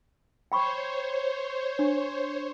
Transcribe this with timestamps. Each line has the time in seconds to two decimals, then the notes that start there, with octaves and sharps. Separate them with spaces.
0.52 C5 C#5 G5 B5 C#6
1.79 D4